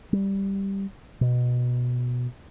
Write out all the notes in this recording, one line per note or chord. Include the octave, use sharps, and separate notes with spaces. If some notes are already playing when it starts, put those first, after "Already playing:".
G3
B2